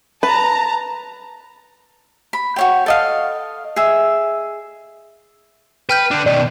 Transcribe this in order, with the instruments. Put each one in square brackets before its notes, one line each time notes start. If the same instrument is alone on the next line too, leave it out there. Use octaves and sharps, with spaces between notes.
[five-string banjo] B4 [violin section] A5 A#5
[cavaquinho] B5
F#4 C#5 G5
A4 D#5 F5
G#4 E5
[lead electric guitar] B4 [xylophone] G5 F6 G6
[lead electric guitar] D3 D4
[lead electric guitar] B2 D#3 [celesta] D5